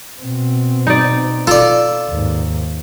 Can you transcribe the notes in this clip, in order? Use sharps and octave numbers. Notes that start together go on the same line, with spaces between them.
B2 C4
D#4 D5
F4 A4 D5
D#2 G#2